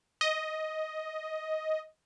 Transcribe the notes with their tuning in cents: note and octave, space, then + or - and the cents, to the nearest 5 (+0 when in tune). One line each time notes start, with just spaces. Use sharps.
D#5 +10